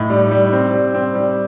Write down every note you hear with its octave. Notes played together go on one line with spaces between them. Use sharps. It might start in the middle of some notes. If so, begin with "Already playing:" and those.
Already playing: A2 D#4
G3
G3
C4
G3
C4
G3